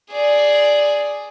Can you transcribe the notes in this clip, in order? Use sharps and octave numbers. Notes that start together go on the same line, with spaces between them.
G#4 D5